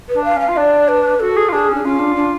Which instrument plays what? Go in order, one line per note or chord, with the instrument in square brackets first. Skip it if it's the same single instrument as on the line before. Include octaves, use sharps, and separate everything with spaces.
[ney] B4
[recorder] D4
[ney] F5
[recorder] C#4 [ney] F5
[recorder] F4
[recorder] D4 [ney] D5
[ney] B4
[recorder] F#4 [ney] A4
[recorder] G#4
F4
[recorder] D4 [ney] G#4
[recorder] C#4
[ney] D4
[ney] C#4 [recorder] F4
[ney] D4
D4